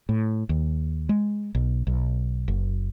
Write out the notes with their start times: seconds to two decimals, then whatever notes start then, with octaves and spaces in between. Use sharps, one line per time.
0.09 A2
0.49 D#2
1.09 G#3
1.55 B1
1.87 B1
2.48 F#1